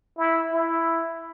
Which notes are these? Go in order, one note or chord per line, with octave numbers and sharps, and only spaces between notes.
E4
E4